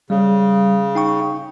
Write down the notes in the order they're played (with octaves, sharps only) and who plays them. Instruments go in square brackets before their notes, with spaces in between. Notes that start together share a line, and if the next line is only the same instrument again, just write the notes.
[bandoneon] C#3 [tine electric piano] G3
[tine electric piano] D#4 G5 C#6